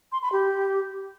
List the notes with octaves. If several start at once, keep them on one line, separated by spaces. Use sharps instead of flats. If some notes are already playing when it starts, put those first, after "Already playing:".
C6
B5
G4